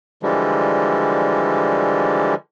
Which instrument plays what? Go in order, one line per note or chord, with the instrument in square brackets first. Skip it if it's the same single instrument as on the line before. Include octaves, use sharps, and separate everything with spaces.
[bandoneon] D3 E3 F3 G3 G#3